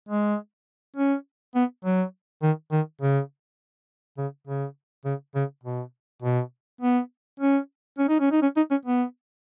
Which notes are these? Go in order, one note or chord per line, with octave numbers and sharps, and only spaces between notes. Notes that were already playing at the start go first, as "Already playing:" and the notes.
G#3
C#4
B3
F#3
D#3
D#3
C#3
C#3
C#3
C#3
C#3
B2
B2
B3
C#4
C#4
D#4
C#4
D#4
C#4
D#4
C#4
B3